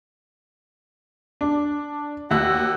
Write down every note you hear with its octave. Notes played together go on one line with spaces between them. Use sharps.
D4
D#2 F#4 E6 F#6